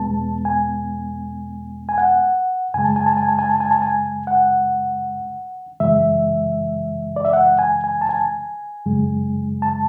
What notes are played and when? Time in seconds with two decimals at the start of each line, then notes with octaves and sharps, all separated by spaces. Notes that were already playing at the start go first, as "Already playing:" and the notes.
Already playing: E2 B2 G#3 B3 A5
0.45 G#5
1.89 G#5
1.98 F#5
2.74 F#2 C#3 G#3 G#5
2.84 A5
2.96 G#5
3.06 A5
3.17 G#5
3.29 A5
3.39 G#5
3.50 A5
3.60 G#5
3.71 A5
3.82 G#5
4.27 F#5
5.80 F#2 C#3 E3 G#3 E5
7.16 D5
7.25 E5
7.33 F#5
7.59 G#5
7.84 G#5
8.01 A5
8.09 G#5
8.86 F#2 C#3 G#3
9.62 A5